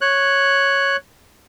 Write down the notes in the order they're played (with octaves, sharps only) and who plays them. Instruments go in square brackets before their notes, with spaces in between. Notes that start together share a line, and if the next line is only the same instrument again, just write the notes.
[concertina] C#5 F#6